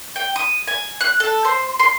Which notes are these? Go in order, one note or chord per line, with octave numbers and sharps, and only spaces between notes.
G5
D#6
G#5
F#6
A4
C5
C6